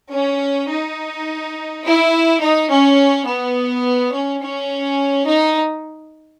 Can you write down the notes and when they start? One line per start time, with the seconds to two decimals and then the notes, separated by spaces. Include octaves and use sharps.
0.12 C#4
0.70 D#4
1.84 E4
2.41 D#4
2.69 C#4
3.26 B3
4.12 C#4
4.41 C#4
5.27 D#4